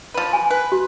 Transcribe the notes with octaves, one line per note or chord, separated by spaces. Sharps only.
F3 B4
G#5
B4
F#4